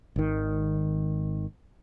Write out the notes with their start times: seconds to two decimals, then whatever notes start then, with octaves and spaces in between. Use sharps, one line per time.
0.16 G#1 D#3